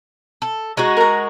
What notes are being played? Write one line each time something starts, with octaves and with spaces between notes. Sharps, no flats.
A4
G#3 D#4 F#4
A#4 A#5